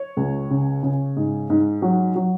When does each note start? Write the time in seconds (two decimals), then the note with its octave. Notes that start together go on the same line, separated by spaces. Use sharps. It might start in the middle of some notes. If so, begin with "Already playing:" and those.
Already playing: C#5
0.17 C#2
0.50 C#3
0.83 C#3
1.17 G#2
1.50 G#2
1.82 F#3
2.16 F#3